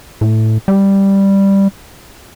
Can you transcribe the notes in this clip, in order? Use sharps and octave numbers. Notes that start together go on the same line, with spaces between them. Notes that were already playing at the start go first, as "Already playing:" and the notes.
A2
G3